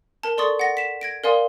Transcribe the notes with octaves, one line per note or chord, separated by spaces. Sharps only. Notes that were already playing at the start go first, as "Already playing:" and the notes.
A#4 A5
A4 D5 C6 C#6 D#6 A6
F#5 A6 A#6
B6 E7
G#6 A#6 D7
A#4 D5 F5 G#5 C6 D#6